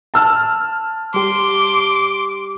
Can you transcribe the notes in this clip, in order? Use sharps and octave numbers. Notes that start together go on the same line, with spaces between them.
A5 E6 F6
G3 G4 C6 D6